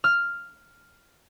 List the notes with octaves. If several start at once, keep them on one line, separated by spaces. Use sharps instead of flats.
F6